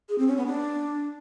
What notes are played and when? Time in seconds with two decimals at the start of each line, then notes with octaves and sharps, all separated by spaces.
0.09 G#4
0.18 C4
0.28 C#4
0.37 B3
0.46 D4